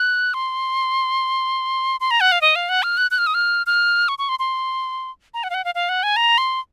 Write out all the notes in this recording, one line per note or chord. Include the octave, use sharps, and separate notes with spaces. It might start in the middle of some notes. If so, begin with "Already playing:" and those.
Already playing: F#6
C6
C6
A#5
F#5
F5
D#5
F5
F#5
F6
F#6
F#6
F6
D#6
F6
F6
C#6
C#6
C6
C6
A#5
F#5
F5
F#5
F5
F5
F#5
G#5
A#5
C6